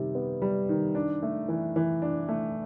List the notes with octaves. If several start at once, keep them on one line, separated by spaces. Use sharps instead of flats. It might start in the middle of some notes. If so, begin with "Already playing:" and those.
Already playing: C3 D#3 G3
B3
G3
D#3
D4
A3
E3
E3
D4
A3